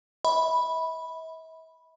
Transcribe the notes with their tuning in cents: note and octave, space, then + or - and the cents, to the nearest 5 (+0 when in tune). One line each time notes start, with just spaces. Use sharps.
E5 -40 B5 -5